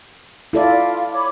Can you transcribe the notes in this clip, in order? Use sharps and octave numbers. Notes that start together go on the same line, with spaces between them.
E4 F4 A4 D5
C#5 B5 D6